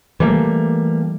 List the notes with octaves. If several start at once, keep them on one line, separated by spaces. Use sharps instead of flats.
E3 G3 A3 A#3